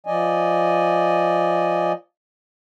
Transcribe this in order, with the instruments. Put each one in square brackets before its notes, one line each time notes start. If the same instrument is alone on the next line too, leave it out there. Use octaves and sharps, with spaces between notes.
[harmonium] F3 D5 D#5 G#5